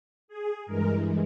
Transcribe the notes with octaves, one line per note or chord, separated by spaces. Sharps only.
G#4
G2 E3 G#3 A#4